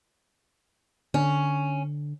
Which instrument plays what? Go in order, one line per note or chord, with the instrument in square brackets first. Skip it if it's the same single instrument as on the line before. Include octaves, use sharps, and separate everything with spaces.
[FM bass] D3 [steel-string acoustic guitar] C#4